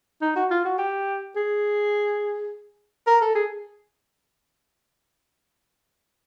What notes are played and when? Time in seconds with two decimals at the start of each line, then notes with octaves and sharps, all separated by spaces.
0.21 D#4
0.35 F#4
0.50 F4
0.65 F#4
0.78 G4
1.36 G#4
3.07 A#4
3.21 A4
3.35 G#4